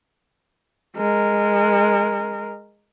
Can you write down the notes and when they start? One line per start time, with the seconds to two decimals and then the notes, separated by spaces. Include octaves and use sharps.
0.97 G#3 A#4